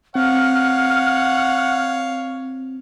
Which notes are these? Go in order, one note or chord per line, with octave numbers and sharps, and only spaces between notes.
C4 C#5 F5 F#5 F6